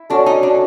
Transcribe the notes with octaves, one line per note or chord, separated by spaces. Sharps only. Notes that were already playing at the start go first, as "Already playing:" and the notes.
Already playing: E4
C#4 D4 F#4 A4
D#4
D4